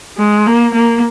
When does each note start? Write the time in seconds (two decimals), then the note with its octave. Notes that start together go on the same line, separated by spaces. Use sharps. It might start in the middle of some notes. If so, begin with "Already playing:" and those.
0.18 G#3
0.46 A#3
0.75 A#3